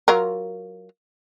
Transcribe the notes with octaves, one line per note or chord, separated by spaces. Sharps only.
F#3 F4 A#4